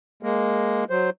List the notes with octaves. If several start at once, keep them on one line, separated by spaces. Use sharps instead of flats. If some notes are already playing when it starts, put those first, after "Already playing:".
G#3 A#3
F#3 C5